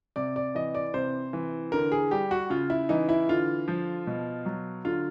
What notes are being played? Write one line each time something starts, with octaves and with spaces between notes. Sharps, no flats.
C3 D5
D5
E3 D#5
D5
C3 C5
E3
D3 A#4
G#4
G3 G4
F#4
C#3 F4
E4
E3 D#4
E4
D3 F4
F3
B2
F#3
D3 F4